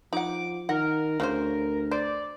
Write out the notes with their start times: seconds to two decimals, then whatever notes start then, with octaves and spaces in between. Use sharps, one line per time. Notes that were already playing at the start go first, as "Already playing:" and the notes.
0.13 F3 D#4 F#5 D6
0.69 D#3 A#4 F#5
1.20 D2 C#3 C#4 C5
1.91 C5 D5